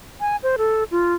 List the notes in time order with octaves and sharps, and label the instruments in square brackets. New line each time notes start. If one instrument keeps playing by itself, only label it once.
[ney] G#5
C5
A4
F4